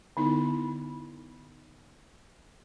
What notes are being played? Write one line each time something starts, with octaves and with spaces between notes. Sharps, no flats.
D3 B3 D#4 E4